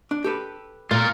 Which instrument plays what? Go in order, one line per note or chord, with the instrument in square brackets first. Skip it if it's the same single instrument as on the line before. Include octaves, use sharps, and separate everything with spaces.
[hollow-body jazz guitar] D4
G4 A4 B4
[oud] A#2 [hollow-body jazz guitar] A3 [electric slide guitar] F4 A#4